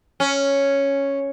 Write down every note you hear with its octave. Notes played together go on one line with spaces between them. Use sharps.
C#4